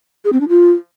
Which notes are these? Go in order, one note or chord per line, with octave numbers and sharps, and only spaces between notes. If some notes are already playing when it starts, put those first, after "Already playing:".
G#4
C4
D4
F4